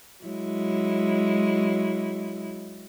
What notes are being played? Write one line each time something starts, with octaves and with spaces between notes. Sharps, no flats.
F#3 G#3 E4